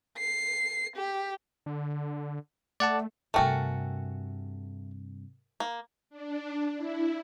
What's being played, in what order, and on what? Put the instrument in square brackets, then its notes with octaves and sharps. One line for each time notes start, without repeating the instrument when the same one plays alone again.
[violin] C7
G4
[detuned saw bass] D3
[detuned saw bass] A3 [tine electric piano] D5 F#5 A5
[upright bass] G2 C3 [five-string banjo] A3 F#4 A4 [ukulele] A#4 G5 G#5
[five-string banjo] A#3
[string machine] D4
E4